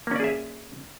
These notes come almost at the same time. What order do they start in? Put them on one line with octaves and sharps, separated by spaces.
A#3 C#4 D5 G#4 E5